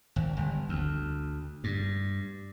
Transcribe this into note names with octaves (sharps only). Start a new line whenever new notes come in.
G#1
G1
D2
G2